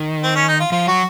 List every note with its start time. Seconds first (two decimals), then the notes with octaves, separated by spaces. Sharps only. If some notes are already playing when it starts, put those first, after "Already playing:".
Already playing: D#3
0.23 C4
0.35 C#4
0.48 D#4
0.60 F4
0.72 F3 F4
0.87 F#3 F#4